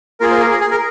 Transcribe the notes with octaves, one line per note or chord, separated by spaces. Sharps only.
A#3 F4 G#4 A#4
C5
A#4
G#4
G#4
A#4